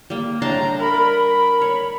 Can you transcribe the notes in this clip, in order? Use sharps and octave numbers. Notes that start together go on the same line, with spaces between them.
G3 A#3
A2 G3 D4 A5 A#5 C6
A#4 B5
B5
C#5